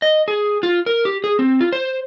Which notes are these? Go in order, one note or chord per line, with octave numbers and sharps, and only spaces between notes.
D#5
G#4
F4
A#4
G4
G#4
C4
F4
C5